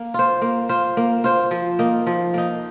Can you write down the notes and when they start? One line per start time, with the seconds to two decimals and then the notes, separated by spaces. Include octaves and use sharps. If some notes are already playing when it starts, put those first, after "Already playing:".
Already playing: A#3
0.14 F4 C5
0.42 A#3
0.69 F4 C5
0.97 A#3
1.24 F4 C5
1.51 F3
1.79 A#3 D#4
2.07 F3
2.34 A#3 D#4